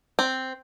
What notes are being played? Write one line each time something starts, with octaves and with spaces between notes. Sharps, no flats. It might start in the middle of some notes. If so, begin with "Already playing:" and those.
C4